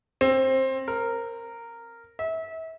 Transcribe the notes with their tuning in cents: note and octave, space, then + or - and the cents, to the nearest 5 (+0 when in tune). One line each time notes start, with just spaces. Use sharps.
C4 +15
A#4 -10
E5 -30